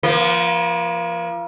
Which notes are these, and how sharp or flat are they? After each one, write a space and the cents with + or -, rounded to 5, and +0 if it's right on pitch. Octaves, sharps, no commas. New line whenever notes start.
F3 -25 A#3 +40